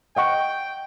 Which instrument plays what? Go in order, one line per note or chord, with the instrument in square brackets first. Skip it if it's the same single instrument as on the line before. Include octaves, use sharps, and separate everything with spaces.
[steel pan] D#5 F#5 C#6 [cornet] G5